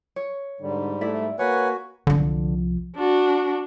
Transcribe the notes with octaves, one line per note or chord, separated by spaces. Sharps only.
C#5
G#2 D3 G3
A3 E4 D5 E5
A#3 F#4 B4 C#5 F#5 G#5
C2 D3 F3
D4 F#4